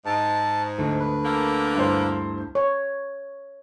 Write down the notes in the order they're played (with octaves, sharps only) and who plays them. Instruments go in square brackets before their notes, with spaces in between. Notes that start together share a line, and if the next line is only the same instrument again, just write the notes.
[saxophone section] G#2 [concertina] A5
[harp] D2
[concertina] B4
[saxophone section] D3 A#3 A#4 [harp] A#5
[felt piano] G2 E4 C5
[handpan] C#5